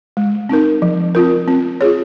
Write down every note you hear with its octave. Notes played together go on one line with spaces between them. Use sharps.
G#3
C4 D#4 A#4
F3
C4 F4 A#4
C4
F4 G#4 C#5